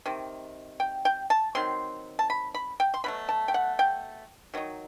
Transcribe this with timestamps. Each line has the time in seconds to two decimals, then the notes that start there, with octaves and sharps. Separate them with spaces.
0.06 C3 D#3
0.80 G5
1.05 G5
1.30 A5
1.55 D#3 F#3 C4 C6
2.19 A5
2.30 B5
2.54 B5
2.80 G5
2.94 C6
3.04 B2 F#3 A3 B5
3.29 A5
3.48 G5
3.54 F#5
3.79 G5
4.54 D#3 F#3 D#4